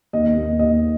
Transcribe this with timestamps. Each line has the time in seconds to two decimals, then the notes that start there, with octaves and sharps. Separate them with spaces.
0.13 D#2 D#5
0.37 D#2
0.59 D#2 D#5